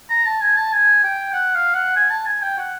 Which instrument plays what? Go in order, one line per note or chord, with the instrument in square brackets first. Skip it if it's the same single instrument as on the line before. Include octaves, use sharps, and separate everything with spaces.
[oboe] A#5
A5
G#5
A5
G#5
G5
F#5
F5
F#5
G#5
A5
G#5
G5
F#5